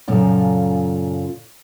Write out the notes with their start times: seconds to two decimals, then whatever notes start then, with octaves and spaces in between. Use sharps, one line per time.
0.08 F#2 A#2 C#3 F4 A4